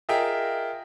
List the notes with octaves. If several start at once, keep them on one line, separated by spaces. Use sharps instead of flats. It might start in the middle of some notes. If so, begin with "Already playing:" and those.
F4 G#4 A#4 D#5 E5 G5